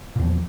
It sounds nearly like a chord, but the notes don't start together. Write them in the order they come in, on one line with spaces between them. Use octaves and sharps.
A#2 E2 F3